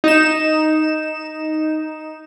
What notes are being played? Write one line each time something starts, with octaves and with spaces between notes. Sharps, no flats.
D#4 E7